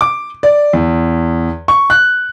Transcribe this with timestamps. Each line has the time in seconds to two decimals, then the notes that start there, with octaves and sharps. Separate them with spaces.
0.01 D6
0.43 D5
0.73 E2
1.68 C#6
1.90 F#6